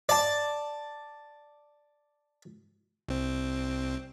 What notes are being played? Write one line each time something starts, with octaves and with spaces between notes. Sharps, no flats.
D5 A5
C2 C4